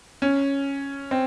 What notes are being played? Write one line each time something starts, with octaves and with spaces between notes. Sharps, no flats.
C#4
C4